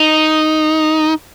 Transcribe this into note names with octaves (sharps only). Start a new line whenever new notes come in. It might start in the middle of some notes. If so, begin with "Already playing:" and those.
Already playing: D#4